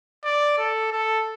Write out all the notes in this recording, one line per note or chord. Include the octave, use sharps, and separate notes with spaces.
D5
A4
A4